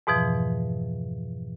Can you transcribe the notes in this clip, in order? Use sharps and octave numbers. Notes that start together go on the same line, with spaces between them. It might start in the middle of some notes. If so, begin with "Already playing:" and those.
F2 G#2 B2 E3 F3